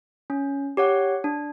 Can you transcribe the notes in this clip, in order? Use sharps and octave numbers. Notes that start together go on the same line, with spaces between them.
C#4
G4 C#5 F#5
D4